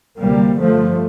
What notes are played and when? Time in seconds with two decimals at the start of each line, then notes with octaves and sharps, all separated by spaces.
0.18 D2 C3 G3 A#3
0.59 G1 G2 F3 A3